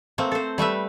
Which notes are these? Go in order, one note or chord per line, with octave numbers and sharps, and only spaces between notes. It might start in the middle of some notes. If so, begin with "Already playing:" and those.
A3 A#3 C4
A4 C5
G3 A3 B4 E5